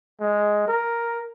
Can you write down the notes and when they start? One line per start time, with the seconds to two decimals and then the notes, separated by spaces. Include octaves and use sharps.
0.20 G#3
0.68 A#4